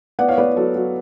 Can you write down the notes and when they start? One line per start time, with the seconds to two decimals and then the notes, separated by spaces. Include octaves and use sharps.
0.19 B3 D5 F#5
0.28 C#5 F5
0.38 B3 B4 D5
0.57 F#3 A4
0.75 F#3